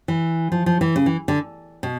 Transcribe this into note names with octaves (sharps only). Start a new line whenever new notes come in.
E3
F3
F3
E3
C#3
E3
D3
B2